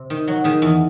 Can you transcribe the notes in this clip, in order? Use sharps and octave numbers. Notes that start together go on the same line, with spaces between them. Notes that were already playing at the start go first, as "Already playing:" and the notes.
Already playing: C3
D#3
F#3
D#3 G#4
E2